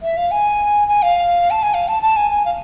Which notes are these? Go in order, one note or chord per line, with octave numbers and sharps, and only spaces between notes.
E5
F5
G#5
G#5
F5
A5
G#5
F5
A5
A5
G#5
G#5
F5